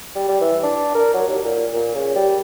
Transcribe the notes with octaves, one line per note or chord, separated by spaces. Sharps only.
G3
G3
E3
D4
A#4
F#3
D#2
A#2
A#2
C#3
G3